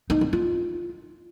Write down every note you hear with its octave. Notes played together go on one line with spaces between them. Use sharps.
D#4
C4
F4